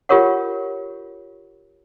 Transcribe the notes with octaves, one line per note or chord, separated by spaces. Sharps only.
F4 G4 A#4 C#5 F#5